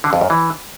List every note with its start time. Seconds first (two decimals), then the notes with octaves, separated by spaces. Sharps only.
0.04 D3
0.13 F2
0.21 F#2
0.30 E3